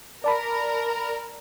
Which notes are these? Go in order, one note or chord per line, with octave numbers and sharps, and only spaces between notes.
A#4 D5 A5 B5